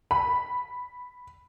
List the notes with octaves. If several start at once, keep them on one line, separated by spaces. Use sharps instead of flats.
B5